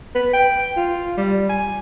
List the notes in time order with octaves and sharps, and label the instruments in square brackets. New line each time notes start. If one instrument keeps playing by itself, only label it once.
[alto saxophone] B4
G5
F4
G3
G#5